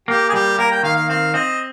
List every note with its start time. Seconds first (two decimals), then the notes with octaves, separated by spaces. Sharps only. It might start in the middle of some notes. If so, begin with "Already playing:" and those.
0.08 A#3 G4
0.29 G#4
0.33 G3 G4
0.58 A#3 A#4
0.71 G5
0.83 D#3 F5
0.96 F5
1.09 C4 F5
1.34 C4 D#5